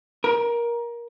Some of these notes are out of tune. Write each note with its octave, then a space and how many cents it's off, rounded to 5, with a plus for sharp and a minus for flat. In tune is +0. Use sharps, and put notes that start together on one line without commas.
A#4 +20